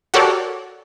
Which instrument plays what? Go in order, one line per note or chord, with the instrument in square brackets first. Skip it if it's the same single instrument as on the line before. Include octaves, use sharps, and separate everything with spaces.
[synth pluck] F#4 G4 A4 A#4 C#5 D5